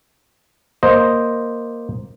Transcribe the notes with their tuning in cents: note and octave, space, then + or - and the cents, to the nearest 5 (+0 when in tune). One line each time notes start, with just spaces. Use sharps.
A#3 +0 C5 +0 D#5 +0